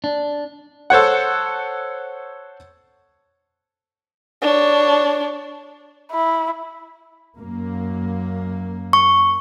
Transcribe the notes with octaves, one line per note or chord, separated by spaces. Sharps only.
D4
A4 C5 C#5 F#5
D4 C#5
E4
F#2 A#3
C#6